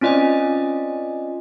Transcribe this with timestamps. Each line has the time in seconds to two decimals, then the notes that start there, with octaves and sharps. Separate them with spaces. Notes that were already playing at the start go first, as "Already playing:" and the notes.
0.01 C4 C#4 F4 D5 D#5 G#5